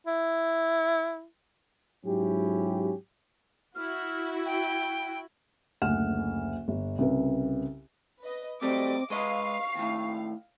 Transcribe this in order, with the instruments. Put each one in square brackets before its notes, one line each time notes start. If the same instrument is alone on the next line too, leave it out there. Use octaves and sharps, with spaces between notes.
[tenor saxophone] E4
[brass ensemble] G#2 F#3 C#4 E4 G4
[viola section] E4 F#4 [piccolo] F6
[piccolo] G5
[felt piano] F#1 D2 F#5 F6 E7
G1
C2 C#3 C#4 B4
[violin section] B4 D#5
[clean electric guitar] F#3 G3 A3 [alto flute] C4 [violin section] D#5 D6
[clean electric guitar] G#3 B4 D#5 [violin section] F5 C7 [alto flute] C#6
[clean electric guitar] D#2 A2